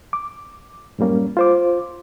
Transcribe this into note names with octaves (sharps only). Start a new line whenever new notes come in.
D6
F#2 A2 G3 A#3 C#4
F4 C5 D6